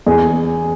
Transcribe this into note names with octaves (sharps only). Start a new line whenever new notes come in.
E2 G#4